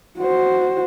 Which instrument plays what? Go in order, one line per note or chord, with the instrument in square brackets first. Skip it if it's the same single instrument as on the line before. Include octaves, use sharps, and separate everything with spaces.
[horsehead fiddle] F#4 C5